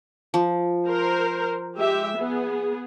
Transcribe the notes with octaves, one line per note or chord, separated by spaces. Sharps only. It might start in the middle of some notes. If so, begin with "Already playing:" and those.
F3
A#4 C5
G#3 G4 E5
B3 G#4